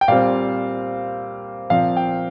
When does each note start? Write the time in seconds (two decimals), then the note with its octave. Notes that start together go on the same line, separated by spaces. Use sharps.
0.01 G5
0.08 A#2 G3 C4 F5
1.70 A#2 F3 C4 F5
1.97 G5